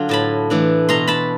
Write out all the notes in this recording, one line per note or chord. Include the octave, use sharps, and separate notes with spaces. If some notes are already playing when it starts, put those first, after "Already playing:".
Already playing: D3 F#3 D4 F4
A2 A5 B5
E3 A3 D4
B2 A#5 C6
A5 B5